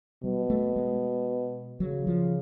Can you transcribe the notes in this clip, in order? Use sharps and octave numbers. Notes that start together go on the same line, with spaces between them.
B2 G3
A3
G#3
C#3 F#3
F3